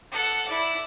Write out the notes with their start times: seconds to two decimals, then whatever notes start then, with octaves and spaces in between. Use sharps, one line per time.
0.12 A4 F#5
0.48 E4 D5